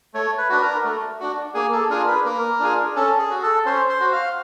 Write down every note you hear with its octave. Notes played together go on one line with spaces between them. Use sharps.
A3 C#5
B4
D4 F#4 B4
A#4
A3
D4 F#4
A#3 G#4
A4
D4 F4 G#4 A#4
B4
A#3 A#4
D4 F4 G#4
C#4 A4
G#4
F#4
A4
C#4 C5
C5
F#4
F5